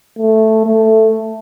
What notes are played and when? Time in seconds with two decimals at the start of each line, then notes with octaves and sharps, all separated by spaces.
0.19 A3
0.66 A3